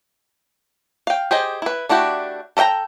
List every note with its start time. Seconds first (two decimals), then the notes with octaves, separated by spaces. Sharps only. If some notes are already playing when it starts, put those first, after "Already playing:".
1.07 F5 G5
1.31 G4 G#4 C5 D#5
1.62 E4 B4
1.89 A3 D4 E4 F#4 G4
2.57 A4 A#4 E5 G5 A#5